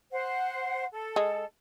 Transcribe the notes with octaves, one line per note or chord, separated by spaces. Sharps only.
C5 F#5
A4
G#3